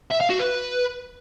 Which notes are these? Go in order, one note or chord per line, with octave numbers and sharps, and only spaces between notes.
E5
F5
F#4
B4